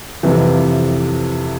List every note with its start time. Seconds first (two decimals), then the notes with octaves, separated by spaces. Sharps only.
0.23 F2 C3 E3